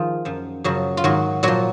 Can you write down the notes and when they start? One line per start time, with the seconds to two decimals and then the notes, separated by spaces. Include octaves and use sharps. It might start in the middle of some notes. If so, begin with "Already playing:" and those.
Already playing: D#3 F3 F4 G#4
0.25 F#2 F3
0.64 F#2 C#3 F3 F#3 F#4
0.97 F4
1.04 G#2 D#3 F#3 F#4
1.43 A#2 F3 F#3 F#4